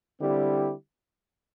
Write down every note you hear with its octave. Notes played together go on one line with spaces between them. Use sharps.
D3 G3 C4 E4 G4